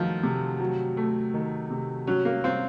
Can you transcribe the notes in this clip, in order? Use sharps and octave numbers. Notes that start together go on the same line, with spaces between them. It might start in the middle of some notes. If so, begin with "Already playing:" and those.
Already playing: D#3 F3 F#3 A3
C3
F#3
A3
D#3
C3
F#3 C#4
A#3
C4 F4